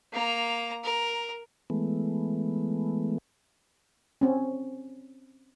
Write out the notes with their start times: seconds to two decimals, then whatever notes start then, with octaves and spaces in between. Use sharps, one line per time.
0.13 A#3 A#5
0.84 A#4
1.70 E3 G#3 A3 B3
4.21 C4 C#4